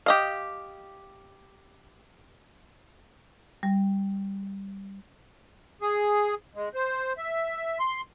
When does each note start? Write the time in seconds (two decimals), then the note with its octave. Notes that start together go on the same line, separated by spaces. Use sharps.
0.06 G4 D#5 F5
3.63 G3
5.82 G#4
6.55 G#3
6.74 C5
7.18 E5
7.80 C6